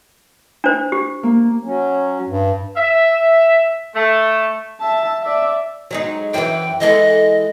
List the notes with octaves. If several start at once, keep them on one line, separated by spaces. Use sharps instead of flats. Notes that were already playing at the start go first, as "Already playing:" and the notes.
D4 C5
G4
A#3
F#3 C#4
G2
E5
A3
E5 A5
D5 E5
F#3 G#3 D#4
F#2 E3 G5
E3 G#3 A4 D#5